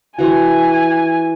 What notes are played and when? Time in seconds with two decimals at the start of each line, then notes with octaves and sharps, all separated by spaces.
0.19 E3 F#4 G#5